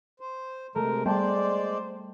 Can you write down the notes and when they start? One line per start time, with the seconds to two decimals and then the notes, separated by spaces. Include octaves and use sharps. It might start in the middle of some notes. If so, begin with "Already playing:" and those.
0.20 C5
0.75 C3 G#3 A3 A#4
1.06 G3 G#3 C5 D5 G5 A5 C6